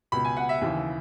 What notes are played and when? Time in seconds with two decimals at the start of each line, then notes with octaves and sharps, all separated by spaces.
0.12 C#2 B2 B5
0.25 G#5
0.37 F#5
0.49 E5
0.61 D#2 C#3 E3